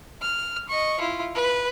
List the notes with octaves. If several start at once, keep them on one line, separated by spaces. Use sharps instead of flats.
F6
D#5 C#6
E4 F4
B4